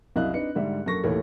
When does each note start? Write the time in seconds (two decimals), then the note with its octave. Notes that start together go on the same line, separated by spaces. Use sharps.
0.16 C2 F#2 E4 D#5 F5 F#6
0.33 C4 D4 D#4 B4 C#7
0.55 G#2 D3 G3 E5
0.86 F#2 A#3 A4 C#6 A#6
1.03 D#2 A2 E3 A3 A#4 C#5